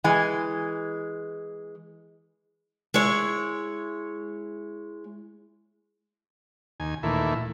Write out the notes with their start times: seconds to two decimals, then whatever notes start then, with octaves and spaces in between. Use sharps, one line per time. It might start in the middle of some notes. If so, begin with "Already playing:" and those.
0.04 E3 G#3 G#5
2.94 G#3 E4 C#5
6.80 D#2 G#5
7.03 D#2 A#2 E3 A3 E4